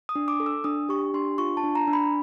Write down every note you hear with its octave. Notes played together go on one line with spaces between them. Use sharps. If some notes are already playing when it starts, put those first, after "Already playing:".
D#6
D4
D6
A4
E6
D4 D#6
G4 C#6
D4 C6
F4 C#6
A5
D4
A#5
D4
B5